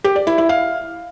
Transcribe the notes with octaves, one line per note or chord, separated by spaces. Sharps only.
G4
D5
E4
E4
F5